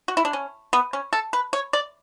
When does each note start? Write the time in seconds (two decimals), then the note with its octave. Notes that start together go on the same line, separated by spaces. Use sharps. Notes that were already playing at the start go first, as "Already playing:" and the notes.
0.08 F#4
0.17 E4
0.25 D4
0.33 C#4
0.73 B3
0.93 C#4
1.13 A4
1.33 B4
1.53 C#5
1.73 D5